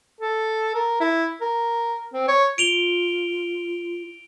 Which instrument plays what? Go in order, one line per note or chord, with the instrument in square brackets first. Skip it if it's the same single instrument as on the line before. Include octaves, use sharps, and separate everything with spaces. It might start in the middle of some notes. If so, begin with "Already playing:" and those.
[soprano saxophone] A4
A#4
E4
A#4
C4
C#5
[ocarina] F4 [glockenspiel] D7 F7 G7